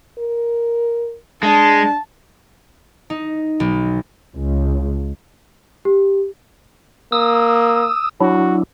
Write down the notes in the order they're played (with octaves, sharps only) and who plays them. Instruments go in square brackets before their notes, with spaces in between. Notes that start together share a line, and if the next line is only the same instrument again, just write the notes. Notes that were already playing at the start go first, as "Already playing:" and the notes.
[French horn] A#4
[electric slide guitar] G#3 [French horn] D4 [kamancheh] A5
[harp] D#4
B1
[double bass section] C#2
[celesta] G4
[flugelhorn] A#3 [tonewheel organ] D#6 E6
[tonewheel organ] F#3 D4 E4 [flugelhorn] F#4